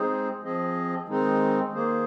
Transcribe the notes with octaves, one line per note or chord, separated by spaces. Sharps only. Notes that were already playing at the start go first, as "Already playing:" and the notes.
Already playing: G#3 C4 D#4 G#4 C5
F3 C4 G#4 D#5
D#3 G#3 C4 D#4
D#3 A#3 G#4 C5